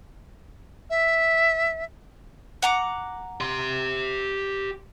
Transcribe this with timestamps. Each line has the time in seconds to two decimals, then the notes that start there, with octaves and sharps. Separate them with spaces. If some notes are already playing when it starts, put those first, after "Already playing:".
0.90 E5
2.62 F#5 A#5 D6
3.41 G4 C6